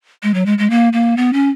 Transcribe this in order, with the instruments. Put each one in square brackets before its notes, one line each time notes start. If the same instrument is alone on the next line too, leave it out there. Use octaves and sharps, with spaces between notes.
[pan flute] G#3
F#3
G#3
G#3
A#3
A#3
B3
C#4